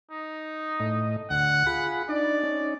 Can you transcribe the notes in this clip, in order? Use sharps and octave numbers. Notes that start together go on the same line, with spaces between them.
D#4
A2 D#5
D2 F#5
F4 G#4 B5
D4 D#4 D5
C#4 D#4